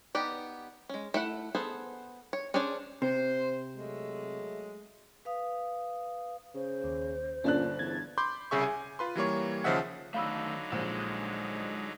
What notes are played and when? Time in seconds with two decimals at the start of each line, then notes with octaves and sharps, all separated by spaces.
0.15 B3 D#4 G4 D5
0.89 G#3 C#4
1.14 A3 E4 F#5
1.55 B3 G#4 A4 C5
2.33 C#5
2.54 C#4 D4 G#4 C5 D5
3.02 C3 C5
3.76 F#3 G#3 A3
5.25 B4 F5 D#6
6.55 C#3 C5
6.84 D#2
7.44 G1 A#2 C#4 D4 F#6
7.79 E2 G#6 A6
8.18 B5 C6 D6 G6
8.51 C2 C#3 G#4 E5 C#6
8.62 G#5
8.99 F4 B4 C6
9.16 E3 G3 A#3 C#5
9.64 D#2 C#3 F3 D#5 E5 F#5
10.14 D3 D#3 F#3 A3 D#4 F5 B5 E6
10.72 A#1 G#3